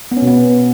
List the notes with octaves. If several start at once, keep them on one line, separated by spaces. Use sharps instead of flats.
B3
C#4
B2
B3